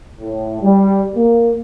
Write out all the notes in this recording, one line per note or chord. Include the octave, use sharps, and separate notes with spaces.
A2
G3
A#3